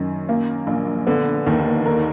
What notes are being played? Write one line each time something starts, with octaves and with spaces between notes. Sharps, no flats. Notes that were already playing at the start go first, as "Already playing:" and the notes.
Already playing: F#2 D#3
A#3
A#1
D3 B3
D#2 D#3
D3 A#4